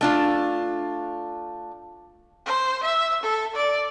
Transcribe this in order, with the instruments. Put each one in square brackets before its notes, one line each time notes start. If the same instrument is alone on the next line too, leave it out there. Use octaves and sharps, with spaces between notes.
[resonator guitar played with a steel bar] A3 D4 F4
[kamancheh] C5
E5
A4
D5